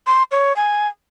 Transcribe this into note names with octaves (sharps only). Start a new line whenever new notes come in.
C6
C#5
G#5